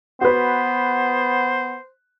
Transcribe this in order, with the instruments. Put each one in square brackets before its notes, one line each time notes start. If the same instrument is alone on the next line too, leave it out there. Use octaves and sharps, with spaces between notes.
[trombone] B3 [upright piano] F#4 B4 [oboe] C5